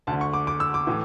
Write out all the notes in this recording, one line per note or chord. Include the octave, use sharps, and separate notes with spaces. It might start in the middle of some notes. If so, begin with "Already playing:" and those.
D2 D3 A5
C#6
D6
D6
E6
D6
A2 E3